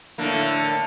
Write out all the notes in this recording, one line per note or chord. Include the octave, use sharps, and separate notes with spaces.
A2 D3 A#3